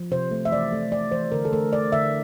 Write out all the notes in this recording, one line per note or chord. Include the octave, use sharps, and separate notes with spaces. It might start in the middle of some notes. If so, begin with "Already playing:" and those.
Already playing: F3
C3 C5
A3
E5
E3 D5
A3
A3 D5
E3 C5
D3 A#4
A4
A3 A#4
A3 D5
D3 E5